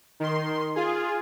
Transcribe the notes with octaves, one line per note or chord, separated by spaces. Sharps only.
D#3 C6
F4 G#4